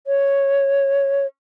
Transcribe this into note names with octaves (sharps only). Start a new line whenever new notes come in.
C#5